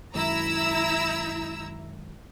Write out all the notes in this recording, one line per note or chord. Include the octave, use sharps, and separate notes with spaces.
F#2 D#3 G#3 E4 A#5 E6